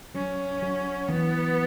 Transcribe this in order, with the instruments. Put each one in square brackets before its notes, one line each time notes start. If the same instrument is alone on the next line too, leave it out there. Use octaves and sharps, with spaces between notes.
[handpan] F#3 [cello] C#4
[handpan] F#3
[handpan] E3 [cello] B3